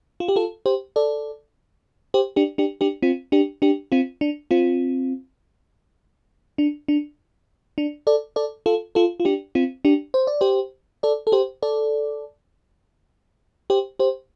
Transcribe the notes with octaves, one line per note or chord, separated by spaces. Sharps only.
F4
G4
F4 A4
G4 C5
A4 D5
G4 C5
D4 G4
D4 G4
D4 G4
C4 F4
D4 G4
D4 G4
C4 F4
D4
C4 F4
D4
D4
D4
A4 D5
A4 D5
F4 A4
F4 A4
F4
D4 G4
C4 F4
D4 G4
C5
D5
G4 C5
A4 D5
A4
G4 C5
A4 D5
G4 C5
G4 C5